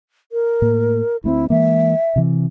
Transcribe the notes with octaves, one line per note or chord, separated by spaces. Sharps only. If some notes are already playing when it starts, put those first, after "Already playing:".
A#4
A2 A#3
D2 A3 C4 E4
E3 G#3 A#3 E5
C3 E3